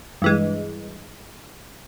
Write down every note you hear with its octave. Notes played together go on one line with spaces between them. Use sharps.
G2 E3 G#3